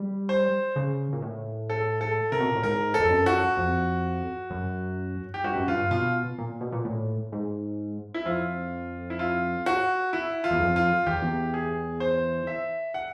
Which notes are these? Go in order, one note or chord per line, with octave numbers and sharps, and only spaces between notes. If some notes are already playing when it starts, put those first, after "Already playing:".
Already playing: G3
C5
C#3
A#2
A2
A4
A4
C3 A#4
B2
A#2
A2
G#2 A#4
A4
F2
F#2
F#4
F2
F#2
G4
G2 F#4
F#2
G2 F4
B2 F4
A#2
B2
A#2
A2
G#2
E4
F2 F4
E4
F4
F#4
E4
F4
E2
F2
F4
E2 G4
E2
G#4
C5
E5
F#5